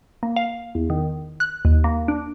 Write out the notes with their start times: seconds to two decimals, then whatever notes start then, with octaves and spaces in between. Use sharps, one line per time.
0.23 A#3
0.36 F5
0.75 E2
0.90 D#3
1.40 F#6
1.65 D#2
1.84 A#3
2.08 D4